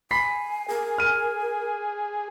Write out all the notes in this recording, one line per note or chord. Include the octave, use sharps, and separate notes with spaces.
G#5 B5 B6 C7
G#4 A#4
F6 D#7